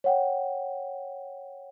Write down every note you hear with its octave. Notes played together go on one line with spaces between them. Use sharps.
C#5 F#5 G5